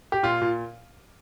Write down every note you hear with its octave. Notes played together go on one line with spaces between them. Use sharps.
G4
A#2 F4
A#2